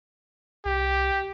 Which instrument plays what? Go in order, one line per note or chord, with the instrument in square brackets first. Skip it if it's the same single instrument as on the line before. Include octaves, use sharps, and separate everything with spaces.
[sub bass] C2 [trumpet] G4